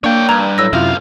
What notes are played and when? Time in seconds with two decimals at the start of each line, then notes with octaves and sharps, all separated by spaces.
0.04 A#3 D4 C#5 G5
0.29 G2 A#5 G#6
0.58 A2 F#3 E6 A#6
0.73 B1 F#2 C3 E4 F4 F5